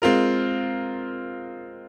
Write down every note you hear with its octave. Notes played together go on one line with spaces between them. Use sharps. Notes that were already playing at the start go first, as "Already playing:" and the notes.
G#3 C4 F4 A#4